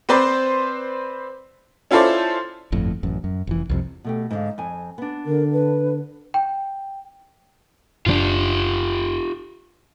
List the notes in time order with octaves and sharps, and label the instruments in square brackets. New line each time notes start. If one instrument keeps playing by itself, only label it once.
[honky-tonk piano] C4 B4 C5 D5 C6
C#4 E4 F4 A4 C5 D5
[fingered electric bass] G1 F2 A2
A1 F#2
F#2
F1 E3
C2 F2 C3
[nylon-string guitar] B2 A3 G4
G#2 D3 F5
F2 G#5
B3 D4
[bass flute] D3 [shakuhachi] A#4
[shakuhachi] B4
[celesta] G5
[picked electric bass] F#1 C#3 D4 [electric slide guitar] F4 G4